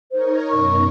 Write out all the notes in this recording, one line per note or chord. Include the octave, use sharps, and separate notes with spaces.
D#4 A#4 C5 C#5
F#2 B2 A#4 C#6